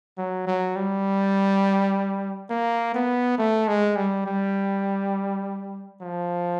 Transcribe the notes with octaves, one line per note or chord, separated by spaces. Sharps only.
F#3
F#3
G3
A#3
B3
A3
G#3
G3
G3
F3